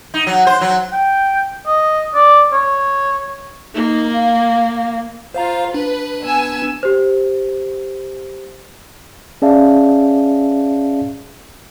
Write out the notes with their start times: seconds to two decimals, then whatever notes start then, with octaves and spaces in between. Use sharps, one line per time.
0.14 D#4
0.27 F#3
0.47 C5
0.61 F#3
0.93 G5
1.67 D#5
2.15 D5
2.53 C#5
3.74 A#3 D#4
4.13 F5
5.35 F4 C5 F5 A#5
5.74 D4 B4
6.24 B3 G#5 E6
6.83 G4 C5
9.42 C#4 G#4 D5 E5 F5 A5